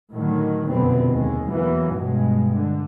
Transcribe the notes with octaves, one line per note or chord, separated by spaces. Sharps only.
A2 D3 D#3 F#3
F1 F#2 B2 D3 B3 C4
D#2 G#3
E2 E3 F#3 A#3
G2 B2 G#3
D3